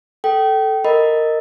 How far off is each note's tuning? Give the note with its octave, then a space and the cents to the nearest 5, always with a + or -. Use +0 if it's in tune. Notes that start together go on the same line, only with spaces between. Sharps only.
A4 +0 G5 -25
A#4 -15 D#5 +0 B5 -10